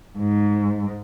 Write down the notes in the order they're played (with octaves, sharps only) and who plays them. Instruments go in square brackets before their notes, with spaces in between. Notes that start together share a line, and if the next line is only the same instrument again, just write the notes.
[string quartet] G#2